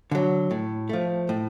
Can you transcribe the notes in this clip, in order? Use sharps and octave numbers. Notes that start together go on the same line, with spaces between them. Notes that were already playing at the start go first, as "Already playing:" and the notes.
D3 F#3
A2
F3 A3
A2